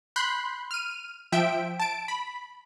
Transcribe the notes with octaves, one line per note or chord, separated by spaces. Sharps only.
B5 C6 F#6 G6
F6 D#7
F3 E5 G5 D7
A5 D7
B5